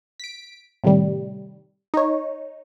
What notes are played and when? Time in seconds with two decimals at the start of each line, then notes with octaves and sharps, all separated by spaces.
0.20 B6 D7
0.84 A2 C3 D#3 G3
1.94 D#4 C#5